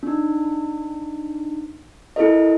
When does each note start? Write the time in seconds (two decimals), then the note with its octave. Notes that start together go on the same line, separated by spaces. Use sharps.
0.03 D4 D#4
2.16 E4 A4 A#4 D#5